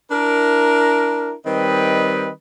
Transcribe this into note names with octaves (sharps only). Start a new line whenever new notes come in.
D4 E4 A#4
D#3 G3 C4 B4 D#5